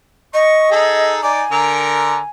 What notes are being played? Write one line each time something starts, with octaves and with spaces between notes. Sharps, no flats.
D#5 C#6
D#4 G#4 A4
D#4 D5 G#5
D3 A#4 A#5